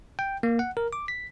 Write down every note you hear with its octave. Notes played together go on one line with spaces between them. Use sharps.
G5
A#3
F#5
A#4
D6
B6